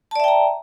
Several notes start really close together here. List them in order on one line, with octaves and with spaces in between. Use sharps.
A5 D5 E5 G5 A#5